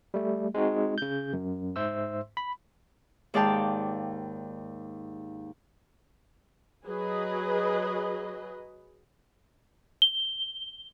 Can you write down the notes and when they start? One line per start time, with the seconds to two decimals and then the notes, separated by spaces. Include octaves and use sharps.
0.14 G3 A3
0.54 G#3 C4 D#4 F#4
0.98 C#3 G6
1.33 F#2
1.76 G#2 C5 E5 C6 E6
2.37 B5
3.34 D#2 G#2 D5 F5 G5 A5
6.86 F#3 G#4 B4 D#5
10.02 G7